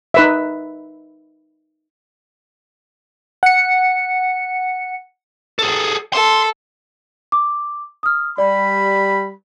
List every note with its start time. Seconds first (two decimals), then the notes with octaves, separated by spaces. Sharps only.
0.14 D#4 B4 E5
3.43 F#5 C#7
5.59 G#4 A4
6.13 A4 C6
7.32 D6
8.03 D#6 F6
8.38 G3 D5 B5